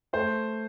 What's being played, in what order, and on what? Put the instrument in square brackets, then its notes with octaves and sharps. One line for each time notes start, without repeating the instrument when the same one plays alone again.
[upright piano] A3 C5